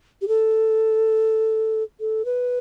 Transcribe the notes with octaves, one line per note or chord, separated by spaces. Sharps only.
G4
A4
A4
B4